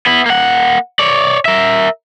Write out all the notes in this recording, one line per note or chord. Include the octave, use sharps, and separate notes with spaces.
B3 E4
A#3 F#5
C#5 D5
A#4 E5